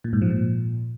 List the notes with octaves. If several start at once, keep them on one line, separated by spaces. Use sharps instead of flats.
A#2
G#2
F3
A#2